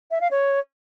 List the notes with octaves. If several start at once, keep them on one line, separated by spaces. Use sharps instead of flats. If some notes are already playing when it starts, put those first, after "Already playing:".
E5
F5
C#5